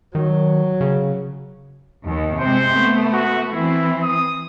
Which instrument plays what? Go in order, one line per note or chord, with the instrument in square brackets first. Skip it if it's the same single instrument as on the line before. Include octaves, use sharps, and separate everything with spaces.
[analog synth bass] D#3 [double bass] F#3
[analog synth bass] C#3
[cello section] D#2
[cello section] C3 G#3 C4 [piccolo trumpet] C5
[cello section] A3 B3
[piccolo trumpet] F#4
[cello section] E3 C4 [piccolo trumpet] E4
[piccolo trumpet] D#6